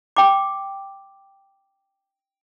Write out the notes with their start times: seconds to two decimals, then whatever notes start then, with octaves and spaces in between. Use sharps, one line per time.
0.17 G5 D6